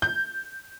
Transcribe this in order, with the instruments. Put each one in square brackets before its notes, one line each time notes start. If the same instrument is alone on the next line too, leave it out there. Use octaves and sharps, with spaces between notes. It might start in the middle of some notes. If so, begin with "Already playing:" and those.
[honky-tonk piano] G6